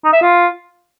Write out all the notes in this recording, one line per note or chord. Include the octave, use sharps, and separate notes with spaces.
D#4
E5
F4